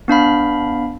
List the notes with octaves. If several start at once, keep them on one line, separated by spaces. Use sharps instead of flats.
B3 D4 F5 B5